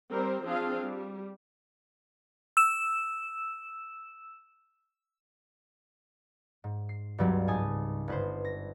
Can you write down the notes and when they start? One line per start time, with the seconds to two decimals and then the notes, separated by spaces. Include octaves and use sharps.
0.11 G3 C4 A#4 C5
0.45 F3 C4 D4 F4 G#4 F5
0.82 G3
2.57 E6 E7
6.64 G#2
6.89 C7
7.18 C#2 G2 C#3 F#3 G3 C4
7.47 G#2 D#4 G#5 A5 D#6
8.08 G1 B4 C5
8.45 A#6